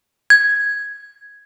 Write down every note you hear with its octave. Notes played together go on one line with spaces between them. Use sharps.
G#6